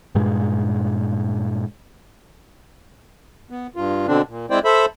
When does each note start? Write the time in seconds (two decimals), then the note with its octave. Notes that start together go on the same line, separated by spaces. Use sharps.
0.15 G2 A#2 G#3
3.51 B3
3.76 G2 F4
4.07 B2 D3 C4 D4
4.28 A#2
4.50 G#3 C4 E4 C5 D5 G5
4.65 A4 C5 E5 B5